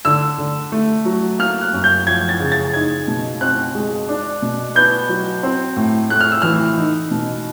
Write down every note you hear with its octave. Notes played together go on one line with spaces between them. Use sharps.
D3 E6
D3
A3
F#3
A#3 F6
F#6
F#2
G6
F3 G#6
A6
C#3
A6
D#4 G#6
B2
C4 F#6
G#3
D4
B2
B3 G6
F#3
C4
A2
A3 F#6
F6
E6
E3 F6
D#4
B2